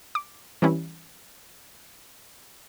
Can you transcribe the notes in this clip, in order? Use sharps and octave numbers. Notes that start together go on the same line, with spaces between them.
D6
E3 G3 C4 C#4 E4